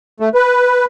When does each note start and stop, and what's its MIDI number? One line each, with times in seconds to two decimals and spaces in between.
0.20 0.29 57
0.35 0.85 71